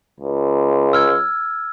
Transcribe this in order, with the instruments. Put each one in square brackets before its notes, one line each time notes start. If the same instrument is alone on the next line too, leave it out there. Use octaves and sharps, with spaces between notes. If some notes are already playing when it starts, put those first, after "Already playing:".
[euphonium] C#2
[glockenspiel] E6 F6 G#6